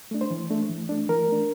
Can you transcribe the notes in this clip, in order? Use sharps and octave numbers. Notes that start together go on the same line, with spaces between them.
A3 D4
C5
E3
A3 D4
E3
A3 D4
E3 A#4
A3 D4